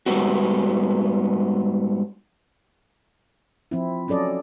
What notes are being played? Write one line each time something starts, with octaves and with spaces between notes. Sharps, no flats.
G#2 F3 G3 B3 C4 F#4
F3 C4 E4
F#3 C#4 A4 D5 D#5